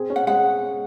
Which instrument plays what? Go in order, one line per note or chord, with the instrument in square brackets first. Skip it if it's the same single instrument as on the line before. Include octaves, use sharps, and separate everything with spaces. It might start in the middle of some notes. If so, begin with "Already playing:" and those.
Already playing: [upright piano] C4 G#4
C#4
[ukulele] F#5
[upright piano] G#3 [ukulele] F#5